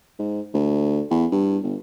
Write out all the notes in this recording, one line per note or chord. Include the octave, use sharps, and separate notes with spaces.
G#2
D2
E2
G2
G1